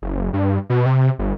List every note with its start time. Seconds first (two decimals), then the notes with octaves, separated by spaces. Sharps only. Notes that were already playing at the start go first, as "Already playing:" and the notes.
0.02 F#1
0.33 G2
0.70 B2
0.86 C3
1.19 G1